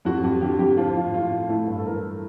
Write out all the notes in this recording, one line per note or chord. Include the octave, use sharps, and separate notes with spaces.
F2 F#4
F2 G4
D3 G4
F2 G4
F3 F4
A2 F4
A2 F4
A2 F4
A3 E4
G2
A4
E3 A#4